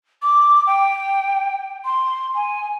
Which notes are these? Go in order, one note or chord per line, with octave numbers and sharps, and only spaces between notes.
D6
G5
C6
G#5